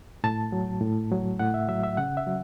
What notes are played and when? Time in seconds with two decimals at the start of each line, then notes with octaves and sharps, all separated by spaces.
0.24 A2 A5
0.52 F#3
0.81 A2
1.11 F#3
1.39 A2 F#5
1.54 E5
1.69 F#3 E5
1.83 E5
1.97 C#3 F#5
2.17 E5
2.27 F#3